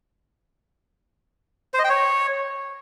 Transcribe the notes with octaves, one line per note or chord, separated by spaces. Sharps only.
C5
D#5
G5
C#5